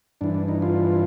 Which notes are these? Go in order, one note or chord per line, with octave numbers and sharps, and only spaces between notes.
G2 E3 D4
D4
D#4
F4